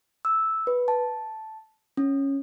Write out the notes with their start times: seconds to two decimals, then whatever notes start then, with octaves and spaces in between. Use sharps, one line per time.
0.25 E6
0.67 B4
0.88 A5
1.97 C#4